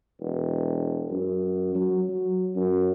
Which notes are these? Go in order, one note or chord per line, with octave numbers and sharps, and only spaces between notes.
E1
F#2
F#3
F#3
F#2